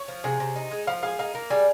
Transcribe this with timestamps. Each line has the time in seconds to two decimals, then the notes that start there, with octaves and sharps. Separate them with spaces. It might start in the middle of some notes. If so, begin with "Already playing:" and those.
Already playing: C#5
0.08 F3
0.24 C3 G#4
0.40 C3
0.56 D#4
0.72 G#3
0.87 F3 F5
1.03 G#4 F5
1.19 D#4 F5
1.35 A#3
1.50 G3 G#4